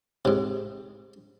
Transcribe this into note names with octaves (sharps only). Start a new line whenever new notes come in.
G#2 C3